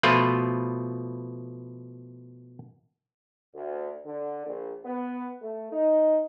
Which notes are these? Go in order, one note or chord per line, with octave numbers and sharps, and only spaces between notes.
B2 F3 A3 F4 B4
D2
D3
A#1
B3
A3
D#4